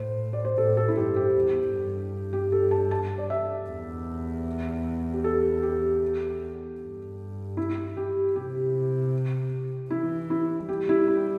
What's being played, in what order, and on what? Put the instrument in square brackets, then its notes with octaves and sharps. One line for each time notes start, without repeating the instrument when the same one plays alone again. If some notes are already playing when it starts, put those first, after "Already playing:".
Already playing: [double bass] A2 [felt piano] C5
[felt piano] D5
C5
[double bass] A2 [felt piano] A4
[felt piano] A4
E4
[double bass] G2 [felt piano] G4
[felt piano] G4
[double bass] E2
G2
[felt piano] G4
A4
A5
A5
D5
E5
[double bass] E2
[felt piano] G4
A4
G4
[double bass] G2
[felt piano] E4
G4
[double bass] C3 [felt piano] G4
[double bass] E3 [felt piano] E4
[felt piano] E4
[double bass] G3 [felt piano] G4
[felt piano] E4
E4